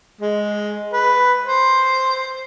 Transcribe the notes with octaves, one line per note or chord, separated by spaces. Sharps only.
G#3
B4
C5